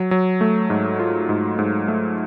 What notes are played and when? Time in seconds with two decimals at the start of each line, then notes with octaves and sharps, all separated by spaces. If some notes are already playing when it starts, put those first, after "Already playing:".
Already playing: F#3
0.11 F#3
0.41 A3
0.70 G#2
0.99 F4
1.29 G#2
1.59 G#2
1.88 A3